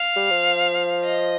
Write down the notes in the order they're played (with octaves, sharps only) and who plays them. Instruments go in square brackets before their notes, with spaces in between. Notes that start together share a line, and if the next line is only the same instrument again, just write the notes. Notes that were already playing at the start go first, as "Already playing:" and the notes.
Already playing: [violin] F5
[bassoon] G3
F3
[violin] D#5